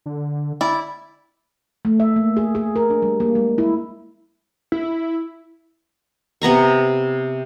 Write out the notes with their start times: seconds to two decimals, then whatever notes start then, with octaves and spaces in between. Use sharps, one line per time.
0.06 D3
0.61 E4 D5
1.85 A3
2.00 E5
2.16 A#3
2.37 G#4
2.55 G#4
2.76 A#4
2.90 D4
3.02 G3
3.20 A#3
3.35 G#3
3.58 E4
4.72 E4
6.42 C3 B3 A#5 C#6